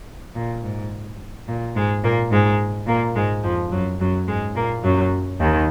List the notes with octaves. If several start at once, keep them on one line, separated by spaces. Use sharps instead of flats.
A#2
G#2
A#2
G#2 G#3
A#2 A#3
G#2 G#3
A#2 A#3
G#2 G#3
F2 F3
F#2 F#3
F#2 F#3
G#2 G#3
A#2 A#3
F#2 F#3
D#2 D#3